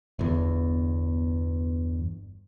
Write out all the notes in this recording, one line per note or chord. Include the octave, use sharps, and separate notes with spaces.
G1 E2